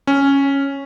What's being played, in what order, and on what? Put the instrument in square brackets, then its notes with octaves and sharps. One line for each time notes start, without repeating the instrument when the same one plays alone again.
[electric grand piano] C#4